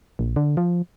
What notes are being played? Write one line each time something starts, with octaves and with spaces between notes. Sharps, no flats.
A#1
D3
F3